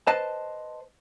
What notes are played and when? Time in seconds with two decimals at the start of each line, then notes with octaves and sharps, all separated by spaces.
0.07 B4 C5 D#5 A5